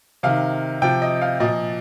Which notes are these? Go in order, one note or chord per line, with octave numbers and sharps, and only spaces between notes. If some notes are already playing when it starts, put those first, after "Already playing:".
C3 D#3 F5
C3 F3 G5
D#5
F5
A#2 F3 D#5